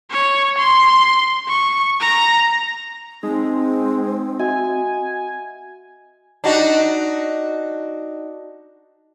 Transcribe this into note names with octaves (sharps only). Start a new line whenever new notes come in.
C#5
C6
C#6
A#5
G#3 C4 D#4
F#4 D#5 E5 G#5
D4 D#4 F#4